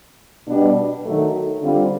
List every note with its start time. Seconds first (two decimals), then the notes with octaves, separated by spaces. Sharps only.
0.48 B2 G3 B3 D4
1.05 D#3 F#3 A3
1.62 D3 G3 C4 F4